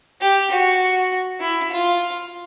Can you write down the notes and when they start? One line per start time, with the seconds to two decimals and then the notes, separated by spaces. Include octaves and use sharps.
0.21 G4
0.51 F#4
1.41 E4
1.71 F4